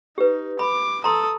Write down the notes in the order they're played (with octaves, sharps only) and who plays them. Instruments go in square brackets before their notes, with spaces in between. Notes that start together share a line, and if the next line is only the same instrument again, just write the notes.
[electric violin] D#4 [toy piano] G4 B4
[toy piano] B5 [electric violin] D6
[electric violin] A4 D#6 [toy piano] A#5 C6